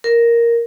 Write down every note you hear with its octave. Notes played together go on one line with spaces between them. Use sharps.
A#4